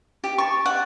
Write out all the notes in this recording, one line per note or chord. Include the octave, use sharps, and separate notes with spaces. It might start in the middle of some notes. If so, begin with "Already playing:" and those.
G4
A5 C#6
D5 F#5